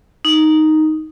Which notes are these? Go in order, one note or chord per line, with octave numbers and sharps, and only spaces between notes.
D#4